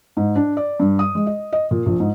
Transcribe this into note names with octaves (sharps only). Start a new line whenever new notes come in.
G#2
D4
D5
G2
D#6
G#3
D#5
D#5
A#2
A#1
G#2